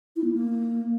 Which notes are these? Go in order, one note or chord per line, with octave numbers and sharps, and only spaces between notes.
E4
B3
A#3